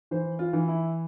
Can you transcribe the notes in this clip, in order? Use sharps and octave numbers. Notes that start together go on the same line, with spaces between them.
E3 C5
F4
E3
E4